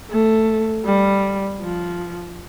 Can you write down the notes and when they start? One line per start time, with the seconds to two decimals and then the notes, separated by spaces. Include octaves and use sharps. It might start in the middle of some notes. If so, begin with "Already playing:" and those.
0.11 A3
0.86 G3
1.61 F3